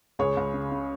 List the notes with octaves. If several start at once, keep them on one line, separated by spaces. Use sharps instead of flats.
C#2 G#4 C#5
C#2
C#3
C#3